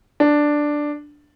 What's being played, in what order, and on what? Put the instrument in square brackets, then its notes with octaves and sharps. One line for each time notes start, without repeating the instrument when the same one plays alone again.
[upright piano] D4